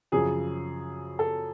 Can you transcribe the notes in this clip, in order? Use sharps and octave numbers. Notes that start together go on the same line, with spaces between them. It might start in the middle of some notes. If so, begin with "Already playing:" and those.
F#2 C#3 F3 G#4
A4